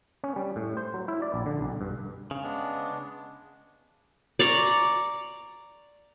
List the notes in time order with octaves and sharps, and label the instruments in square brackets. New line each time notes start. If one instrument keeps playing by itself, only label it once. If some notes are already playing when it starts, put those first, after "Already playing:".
[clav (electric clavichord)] C#4
G3
A2
C5
F#3
E4
D5
A#1
D3
B1
G2
[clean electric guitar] C#3
[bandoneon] G#3 B3 D4
[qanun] D5 A#5 C#6